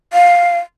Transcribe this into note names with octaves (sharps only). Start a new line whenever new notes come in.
F5